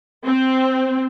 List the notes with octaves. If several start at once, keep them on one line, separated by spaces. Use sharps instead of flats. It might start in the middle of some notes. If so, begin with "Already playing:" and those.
C4